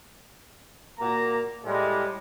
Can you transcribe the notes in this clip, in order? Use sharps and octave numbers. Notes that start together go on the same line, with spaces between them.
A#2 A#3 F#4 A#5
A2 G3 G#3